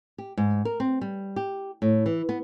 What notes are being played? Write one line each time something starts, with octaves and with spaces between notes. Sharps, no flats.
G4
G#2
A#4
C4
G3
G4
A2
E3
B3